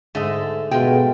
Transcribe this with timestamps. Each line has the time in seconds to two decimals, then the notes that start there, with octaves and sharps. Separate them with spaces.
0.15 G#2 D3 G#3 A3 D#5
0.71 B2 G#3 A3 F4 G5